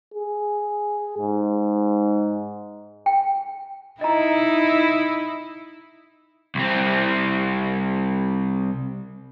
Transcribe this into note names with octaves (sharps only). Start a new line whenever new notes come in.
G#4
G#2
G5
D#4 E4 D#5 A#5
C2 C4